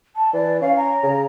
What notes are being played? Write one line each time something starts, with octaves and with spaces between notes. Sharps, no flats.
A5
E3 D5
C#4 F5
A#5
C#3